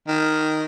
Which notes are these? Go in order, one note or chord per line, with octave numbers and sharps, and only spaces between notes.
D#3